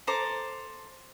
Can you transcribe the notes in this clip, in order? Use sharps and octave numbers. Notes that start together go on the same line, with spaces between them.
A4 C5 A#5 D6